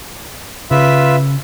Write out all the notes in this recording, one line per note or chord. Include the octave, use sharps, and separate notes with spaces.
C#3 F4 B4 E5